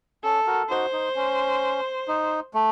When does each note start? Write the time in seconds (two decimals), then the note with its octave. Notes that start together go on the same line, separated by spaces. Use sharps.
0.24 C#4 A4
0.46 F#4 A#4
0.70 D#4 F#4 C5
0.93 D#4
1.16 C#4
2.08 D#4
2.54 A3